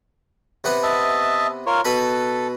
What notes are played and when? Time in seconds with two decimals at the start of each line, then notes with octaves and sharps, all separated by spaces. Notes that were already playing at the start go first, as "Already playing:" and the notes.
0.64 C3 B3 F#5
0.83 D#5 E5 A5
1.66 F4 A#4 C#5
1.85 B2 A4 B4 B5